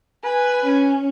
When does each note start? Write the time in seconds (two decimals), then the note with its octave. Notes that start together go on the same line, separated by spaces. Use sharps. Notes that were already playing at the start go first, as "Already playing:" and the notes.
0.24 B4 G#5
0.63 C#4